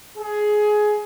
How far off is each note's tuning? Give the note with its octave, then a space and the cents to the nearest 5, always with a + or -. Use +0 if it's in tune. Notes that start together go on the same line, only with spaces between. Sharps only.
G#4 +15